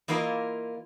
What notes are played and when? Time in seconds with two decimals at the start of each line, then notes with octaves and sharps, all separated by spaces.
0.08 E3 A#3 E4 F4 A#4 D#5